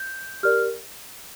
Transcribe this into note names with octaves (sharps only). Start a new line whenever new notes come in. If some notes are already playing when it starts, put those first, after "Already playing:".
Already playing: G6
G4 A#4 D5 F6